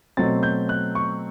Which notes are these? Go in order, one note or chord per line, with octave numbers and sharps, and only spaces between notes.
B2 F#3 A3 C4 A6
G6
F#6
C#6